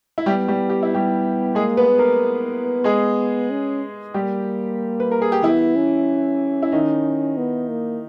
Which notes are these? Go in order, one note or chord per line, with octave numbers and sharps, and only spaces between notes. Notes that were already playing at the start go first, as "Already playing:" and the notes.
E4
G3 B3 G4
G3 G4
G4
E4
G3 G4
G#3 A#3 G#4
B3 B4
B3
A#3 A#4
G#3 G#4
C#4
G3 A#3 G4
B4
A#4
G#4
G4
E3 B3 E4
C#4
E4
D#3 D#4
B3
A#3